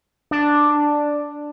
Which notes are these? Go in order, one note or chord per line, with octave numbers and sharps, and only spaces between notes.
D4